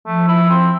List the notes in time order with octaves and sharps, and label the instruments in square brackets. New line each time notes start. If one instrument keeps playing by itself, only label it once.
[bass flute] F3 [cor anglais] A3
[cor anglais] E4
C4